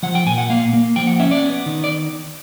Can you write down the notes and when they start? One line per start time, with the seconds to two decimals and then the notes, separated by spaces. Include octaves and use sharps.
0.03 F3 F#5
0.15 G5
0.26 A#2 G#5
0.38 F#5
0.50 A#3 F5
0.73 A#3
0.96 F3 G5
1.07 F#5
1.20 C#4 E5
1.31 D5
1.42 B3
1.66 D#3
1.84 D5